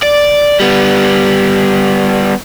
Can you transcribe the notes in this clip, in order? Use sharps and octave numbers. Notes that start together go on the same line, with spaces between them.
D5
G3 B3